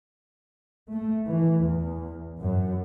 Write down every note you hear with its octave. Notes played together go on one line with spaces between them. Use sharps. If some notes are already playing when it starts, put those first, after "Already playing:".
A3
E3
E2
F#2